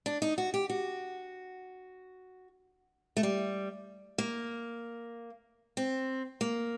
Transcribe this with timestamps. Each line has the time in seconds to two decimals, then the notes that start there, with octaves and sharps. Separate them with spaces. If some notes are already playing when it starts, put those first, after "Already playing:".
0.06 D4
0.22 D#4
0.38 F#4
0.54 G4
0.70 F#4
3.17 A3
3.23 G3
4.18 A#3
5.77 C4
6.41 A#3